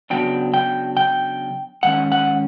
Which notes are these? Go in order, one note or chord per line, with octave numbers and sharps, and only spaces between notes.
C#3 F#3 B3 D4 G5
G5
G5
G#2 D#3 C#4 F#5
F#5